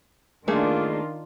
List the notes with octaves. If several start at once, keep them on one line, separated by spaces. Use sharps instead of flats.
D#3 A3 A#3 D4 F4 G#4